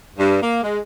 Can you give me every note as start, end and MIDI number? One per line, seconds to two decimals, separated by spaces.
0.19 0.39 43
0.41 0.60 58
0.63 0.78 56